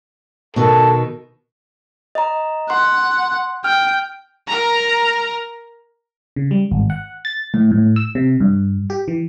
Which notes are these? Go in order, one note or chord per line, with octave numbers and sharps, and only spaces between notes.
B2 D#3 A4
D#5 A#5
F#5 C6
G5 F6
A#4 A#5
C#3
G3
G#1
F#5
A6
A2
A2
E6
C3
G2
G4
E3